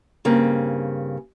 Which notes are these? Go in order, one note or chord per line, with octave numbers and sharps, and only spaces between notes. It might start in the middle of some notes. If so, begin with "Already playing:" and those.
G2 C#3 A#3 C4